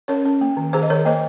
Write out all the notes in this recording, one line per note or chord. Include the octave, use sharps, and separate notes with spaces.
C#4 A#4 C#5
C#4
A#3
D#3
D#3 G#4 C5
D#5
D#3 A#4 C#5
A#3 C5 D#5